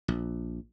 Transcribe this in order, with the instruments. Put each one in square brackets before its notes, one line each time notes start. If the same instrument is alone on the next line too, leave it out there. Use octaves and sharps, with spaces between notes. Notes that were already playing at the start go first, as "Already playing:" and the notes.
[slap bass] A#1